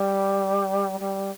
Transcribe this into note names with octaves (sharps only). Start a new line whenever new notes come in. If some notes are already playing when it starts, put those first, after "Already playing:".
Already playing: G3
G3